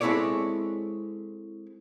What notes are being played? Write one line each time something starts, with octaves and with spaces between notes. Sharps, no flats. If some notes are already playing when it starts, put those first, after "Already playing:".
G#3 C4 E4 A4 C#5 D5